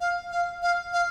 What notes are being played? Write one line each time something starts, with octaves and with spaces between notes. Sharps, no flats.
F5
F5
F5
F5